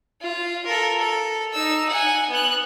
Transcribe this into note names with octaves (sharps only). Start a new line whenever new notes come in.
F4
A4 A#4
A4
D#4 E6
F#5 G#5
B3 F#6